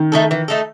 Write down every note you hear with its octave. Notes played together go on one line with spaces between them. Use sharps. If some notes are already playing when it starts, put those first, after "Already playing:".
Already playing: D#3
A3 D#4 A4
E3
A3 D#4 A4